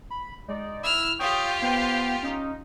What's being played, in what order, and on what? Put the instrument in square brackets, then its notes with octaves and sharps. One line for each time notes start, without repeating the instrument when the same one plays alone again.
[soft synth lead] B5
[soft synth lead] G#3 [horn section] D#4 D5
[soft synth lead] E4 [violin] E6 F6
[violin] F4 G4 [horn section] C#5 G5 [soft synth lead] D#6
[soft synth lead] B3 [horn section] B4 C5 G5
[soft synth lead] C#4 [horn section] D#4